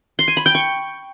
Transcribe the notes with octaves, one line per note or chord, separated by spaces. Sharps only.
C6
G#5
B5
G5
C#6